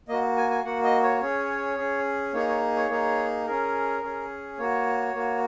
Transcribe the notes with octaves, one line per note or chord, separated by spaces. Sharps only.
A#3 F#4 D#5
G#5
G#5
A#3 F#4 F#5
D#5
C#5
C#4 G#4 C#5
C#4 G#4
A#3 D#4 G#4 C#5
C#5
C#5
A#3 D#4 G#4
C#4 G#4 A#4
C#4 G#4
A#3 F#4 C#5
A#3 F#4